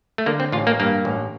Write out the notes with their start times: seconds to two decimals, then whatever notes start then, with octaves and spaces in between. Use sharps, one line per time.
0.18 A3
0.26 D3 A#3
0.40 C4
0.52 A1 F4
0.67 A#3
0.80 G2 A#3
1.05 A1